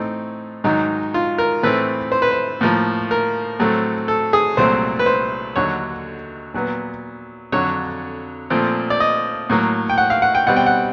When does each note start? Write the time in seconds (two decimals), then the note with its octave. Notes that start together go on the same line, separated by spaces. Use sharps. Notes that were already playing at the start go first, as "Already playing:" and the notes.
Already playing: A2 E3 A3 C4 D#4
0.64 G#2 D#3 F#3 D#4
1.14 F4
1.38 A#4
1.63 A2 E3 A3 C4 B4
2.12 C5
2.22 B4
2.31 C5
2.61 A2 F3 A#3
3.11 A#4
3.59 A2 F#3 A3 C4
4.08 A4
4.33 G#4
4.57 C2 A#2 F#3 A3 C4 C5
4.99 B4
5.06 C5
5.56 D#2 D3 F#3 C#5
6.54 A#2 F#3 B3
7.52 F2 D3 F#3 C#5
8.50 A#2 F3 A3 C4
8.90 D5
9.00 D#5
9.50 A2 F#3 A#3
9.90 G5
9.98 F#5
10.10 F5
10.22 F#5
10.35 G5
10.47 B2 G3 C4 F#5
10.56 G5
10.66 F#5